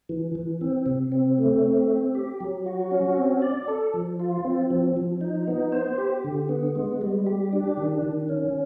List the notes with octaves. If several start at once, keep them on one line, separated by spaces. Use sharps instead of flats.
E3
E3
C4
C3
C4
A3
C4
C4
G4
F#3
F#4
C#4
C4
D5
A4
F3
F4
C4
F3
F3
D#4
B3
C5
G4
D3
B3
G#3
G3
G4
D4
D#3
D#3
C#4